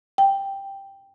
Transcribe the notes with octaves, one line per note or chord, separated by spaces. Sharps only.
G5